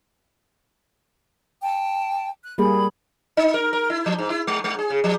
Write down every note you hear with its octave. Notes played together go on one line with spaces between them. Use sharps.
G5 A5
F#6
G3 A#3 G#4 B5
D#4
A#4
A#4
E4
F3
G#2
E4
G#3
G#3
G#4
C#3
F3